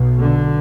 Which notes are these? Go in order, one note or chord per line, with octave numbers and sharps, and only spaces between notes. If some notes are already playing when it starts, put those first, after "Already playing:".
Already playing: B1 B2
D3